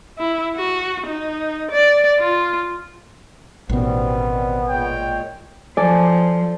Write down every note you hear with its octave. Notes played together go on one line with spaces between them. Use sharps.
E4
F#4
D#4
D5
F4
A1 B2 D#3 G3 B3 C4
A#2 G#3 C#5 G5
F3 A4 D5 G#5